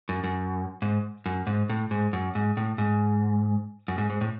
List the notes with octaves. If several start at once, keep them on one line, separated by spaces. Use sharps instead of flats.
F#2
F#2
G#2
F#2
G#2
A2
G#2
F#2
G#2
A2
G#2
F#2
G#2
G#2
A2